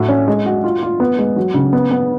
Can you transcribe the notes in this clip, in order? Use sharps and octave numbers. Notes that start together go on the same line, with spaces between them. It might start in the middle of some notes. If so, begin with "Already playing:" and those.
Already playing: A2 F#4
C#4
G#3
F#4
F4
F4
B3
G#3
F#3
C#3
B3
B3